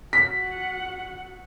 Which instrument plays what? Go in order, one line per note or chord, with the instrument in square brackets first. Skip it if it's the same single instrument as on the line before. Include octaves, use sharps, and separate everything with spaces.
[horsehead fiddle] F#4 F#5 [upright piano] B6